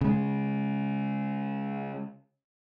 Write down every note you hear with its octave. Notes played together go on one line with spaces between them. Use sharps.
C#3 G#3